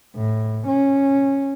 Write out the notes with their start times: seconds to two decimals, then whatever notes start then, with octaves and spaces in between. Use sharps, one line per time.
0.16 A2
0.67 C#4